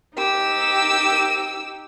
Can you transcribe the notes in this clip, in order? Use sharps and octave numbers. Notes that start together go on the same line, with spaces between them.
D#4 G4 E6